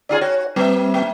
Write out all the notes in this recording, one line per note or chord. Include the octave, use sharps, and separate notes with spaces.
D#4 F4 G#4 D5
F#4 C#5
G3 A#3 C4 E5
A#3